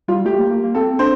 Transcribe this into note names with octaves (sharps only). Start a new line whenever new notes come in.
G3 F4
A3 G4
A#3
A#3
A#3
C4 A4
D4 C5